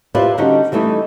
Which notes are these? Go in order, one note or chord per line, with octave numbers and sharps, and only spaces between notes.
E4 F4 G4 B4 C5 D5
D3 G3 C#4 D#4 F#4 G4
E3 G3 A3 D#4 E4